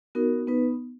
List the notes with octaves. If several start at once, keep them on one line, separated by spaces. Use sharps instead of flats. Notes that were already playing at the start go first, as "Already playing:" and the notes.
B3 D#4 F#4 A#4
B3 D#4 B4